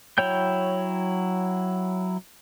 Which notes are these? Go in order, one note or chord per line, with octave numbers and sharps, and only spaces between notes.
F#3 E4 C#5 G5 G6